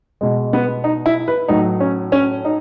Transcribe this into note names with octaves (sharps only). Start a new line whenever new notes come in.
B2 G#3
B3
D#4
E4
B4
A2 F#3 A3 D#4
C#4
C#4
D#4